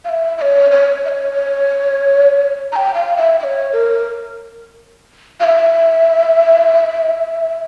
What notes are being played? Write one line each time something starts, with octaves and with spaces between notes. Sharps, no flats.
F5
E5
E5
C#5
C#5
E5
C#5
A#5
G5
F5
E5
E5
C#5
A#4
F5
E5